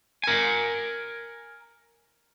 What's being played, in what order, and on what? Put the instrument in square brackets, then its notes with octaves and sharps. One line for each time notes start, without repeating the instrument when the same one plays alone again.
[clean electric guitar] A#4 G#5